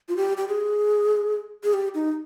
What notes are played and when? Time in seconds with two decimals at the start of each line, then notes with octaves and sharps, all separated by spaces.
0.09 F4
0.17 G4
0.37 G4
0.48 G#4
1.64 G#4
1.74 G4
1.95 D#4